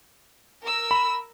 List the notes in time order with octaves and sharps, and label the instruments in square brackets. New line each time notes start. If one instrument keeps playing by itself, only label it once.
[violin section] A#4 E6
[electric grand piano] B5